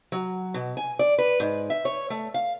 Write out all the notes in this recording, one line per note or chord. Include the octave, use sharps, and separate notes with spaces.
F#3
B2
G#5
D5
B4
G#2
E5
C#5
A3
F5